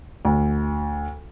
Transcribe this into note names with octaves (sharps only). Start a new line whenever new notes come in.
D2